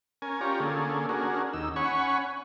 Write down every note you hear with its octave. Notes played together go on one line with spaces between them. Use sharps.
C#4 A#4 G#5
C#4 F4 G4 C#5 D5 A#5
D3 A#3 C#4 G#4 A4
C#4 D4 F#4 G#4 A#4
D#2 D#4 E6
C#4 C#5 F#5 G#5 B5 C#6